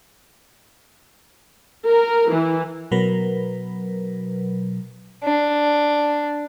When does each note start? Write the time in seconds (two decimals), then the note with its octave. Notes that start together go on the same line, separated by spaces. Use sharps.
1.85 A#4
2.30 E3
2.91 B2 F#3 A#4 B4
5.24 D4